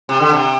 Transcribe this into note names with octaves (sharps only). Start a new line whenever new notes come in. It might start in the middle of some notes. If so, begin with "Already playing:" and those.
C3
D3
C3